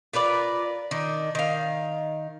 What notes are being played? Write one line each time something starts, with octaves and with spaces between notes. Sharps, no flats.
F4 A#4 B4 D5
D#3 D4
D#3 F5